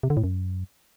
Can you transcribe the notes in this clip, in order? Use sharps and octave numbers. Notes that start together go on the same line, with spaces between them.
C3
D3
A2
F#2